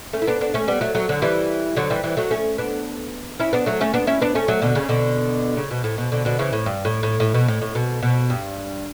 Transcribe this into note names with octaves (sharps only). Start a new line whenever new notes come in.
A3 C#4
E4
B3 D4
B3 D4
A3 C#4
G3 B3
F#3 A3
F#3 A3
D3 F#3
E3 G3
D3 F#3
E3 G3
E3 G3
F#3 A3
A3 C#4
B3 D4
C#4 E4
B3 D4
F#3 A3
A3 C#4
B3 D4
C#4 E4
B3 D4
A3 C#4
F#3 A3
B2 D3
C#3
B2 D3
C#3
B2
A2
B2
B2 D3
B2 D3
C#3 E3
A2
G2
A2
A2
A2
B2
A2
A2
B2
B2
G2